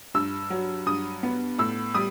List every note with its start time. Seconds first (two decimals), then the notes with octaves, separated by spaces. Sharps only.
0.14 G2 E6
0.50 F#3
0.86 G2 D#6
1.23 B3
1.58 A2 E6
1.95 G3 D#6